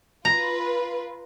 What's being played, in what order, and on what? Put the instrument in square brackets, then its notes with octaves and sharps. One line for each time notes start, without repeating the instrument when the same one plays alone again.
[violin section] F4 B4 [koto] A#5